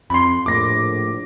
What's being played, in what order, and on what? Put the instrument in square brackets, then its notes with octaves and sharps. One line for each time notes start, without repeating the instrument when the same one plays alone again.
[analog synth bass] F2 [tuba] C4 [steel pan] B5 C6
[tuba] A#1 [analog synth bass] A2 [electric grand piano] D6 A#6